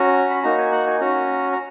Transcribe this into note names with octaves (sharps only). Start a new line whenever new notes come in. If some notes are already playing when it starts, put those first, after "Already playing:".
Already playing: C#4 F#4 A#5
B5
A#3 D#4 F#4 A#5
G#5
F#5
G#5
C#4 F#4 A#5
A#5